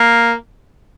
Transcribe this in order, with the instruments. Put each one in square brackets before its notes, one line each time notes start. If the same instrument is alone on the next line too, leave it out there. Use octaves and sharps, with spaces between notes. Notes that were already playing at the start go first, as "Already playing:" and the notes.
Already playing: [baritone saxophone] A#3